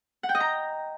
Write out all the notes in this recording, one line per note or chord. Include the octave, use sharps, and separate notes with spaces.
F#5
G5
D#5
A#5